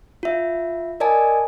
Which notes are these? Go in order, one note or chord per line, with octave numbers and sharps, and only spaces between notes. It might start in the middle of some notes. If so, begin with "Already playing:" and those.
F4 E5
A#4 D5 D#5 G#5 A5